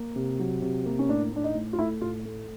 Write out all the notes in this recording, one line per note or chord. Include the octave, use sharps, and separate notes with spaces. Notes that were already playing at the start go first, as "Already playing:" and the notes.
Already playing: A#3
C3
F#3
C3
A#3
C#4
A2 D4
A2 D4
D#4
A2
F4
A3 E4
A2 F4
A3